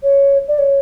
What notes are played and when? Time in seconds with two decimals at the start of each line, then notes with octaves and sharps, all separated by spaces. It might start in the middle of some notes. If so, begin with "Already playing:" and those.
0.03 C#5
0.48 D5
0.59 C#5